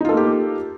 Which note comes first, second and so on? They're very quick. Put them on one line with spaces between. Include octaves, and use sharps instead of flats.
D#4 F4 A4 A#3 G4